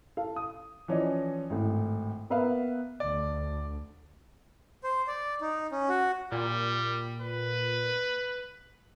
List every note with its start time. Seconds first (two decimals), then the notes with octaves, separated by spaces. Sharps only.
0.17 A4 F5
0.36 D#6
0.88 E3 F3 C#4 D5 D#5
1.50 G#1 A2
2.30 A#3 B3 B4 E5 F5
3.00 D2 D5
4.83 C5
5.07 D5
5.41 D#4
5.72 C#4
5.89 F#4
6.32 A#2 G3
7.21 B4